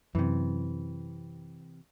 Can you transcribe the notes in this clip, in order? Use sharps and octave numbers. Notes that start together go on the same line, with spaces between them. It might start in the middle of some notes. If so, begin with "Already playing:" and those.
F#2 C3 E3